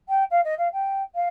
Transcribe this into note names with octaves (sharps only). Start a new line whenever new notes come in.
G5
F5
D#5
F5
G5
F5